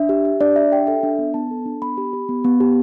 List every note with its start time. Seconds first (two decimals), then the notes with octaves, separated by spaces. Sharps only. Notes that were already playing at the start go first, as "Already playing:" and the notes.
Already playing: D4 E5
0.09 G4
0.25 G4
0.40 D4 D5
0.56 D4 E5
0.72 G4 G5
0.87 A4 E5
1.03 D4
1.18 B3
1.34 B3 A5
1.51 A4
1.66 D4
1.82 B3 B5
1.97 G4
2.13 G4
2.29 B3
2.44 B3
2.60 G4